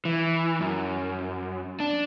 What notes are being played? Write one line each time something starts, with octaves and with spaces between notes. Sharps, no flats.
E3
F#2
D4